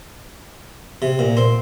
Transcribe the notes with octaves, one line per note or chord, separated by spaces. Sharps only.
C3
A#2
C4